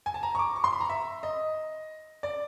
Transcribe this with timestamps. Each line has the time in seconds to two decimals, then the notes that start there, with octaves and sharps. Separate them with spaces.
0.06 G#5
0.14 A5
0.23 A#5
0.35 C#6
0.39 D6
0.56 C#6
0.64 C6
0.73 B5
0.80 A#5
0.89 E5
1.23 D#5
2.23 D5